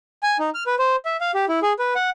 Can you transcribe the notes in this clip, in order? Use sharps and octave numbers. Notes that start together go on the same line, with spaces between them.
G#5
D#4
F6
B4
C5
E5
F5
G4
E4
G#4
B4
F#5